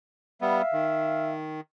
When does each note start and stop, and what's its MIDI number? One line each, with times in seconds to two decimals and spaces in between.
0.41 0.62 55
0.41 0.62 59
0.41 1.33 76
0.41 1.33 77
0.73 1.60 51